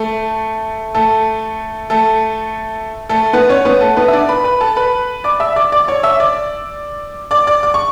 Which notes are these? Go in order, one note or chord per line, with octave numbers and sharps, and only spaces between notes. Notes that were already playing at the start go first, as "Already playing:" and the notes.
Already playing: A3 A4
A3 A4
A3 A4
A3 A4
B3 B4
C#4 C#5
B3 B4
A3 A4
B3 B4
E5
D4 D5
B4 B5
B4 B5
A4 A5
B4 B5
D5 D6
E5 E6
D5 D6
D5 D6
C#5 C#6
E5 E6
D5 D6
D5 D6
D5 D6
D6
C#6